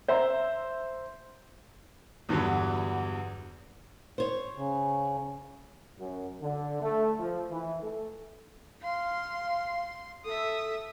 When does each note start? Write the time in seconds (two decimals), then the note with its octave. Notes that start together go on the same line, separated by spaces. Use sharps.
0.08 C5 E5 A#5 C6
2.29 E2 G2 D3 E3 F#3
4.18 C5 C#5
4.56 C#3
5.98 F#2
6.42 D3
6.82 A3
7.18 F3
7.51 E3
7.82 A3
8.83 F5 C6
10.25 A4 E5 D#6